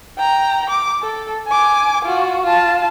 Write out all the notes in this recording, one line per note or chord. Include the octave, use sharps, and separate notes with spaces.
G5 A#5
D6
A4
G#5 D6
F4 F#4
F4 A5